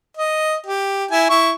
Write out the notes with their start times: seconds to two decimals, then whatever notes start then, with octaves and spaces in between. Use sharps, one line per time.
0.17 D#5
0.66 G4
1.11 E4 G#5
1.30 E4 C#6